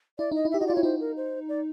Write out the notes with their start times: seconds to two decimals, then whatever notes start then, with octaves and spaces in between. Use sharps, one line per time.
0.18 E4 D5
0.32 D#4 D#5
0.45 E4
0.51 E5
0.54 G4
0.60 F#4 D#5
0.67 D5
0.70 F4
0.75 E4 C#5
0.83 D#4 C5
1.00 A#4
1.17 C5
1.49 D5